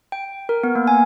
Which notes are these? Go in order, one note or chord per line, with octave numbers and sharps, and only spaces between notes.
G5
A#4
B3
A#3
G#5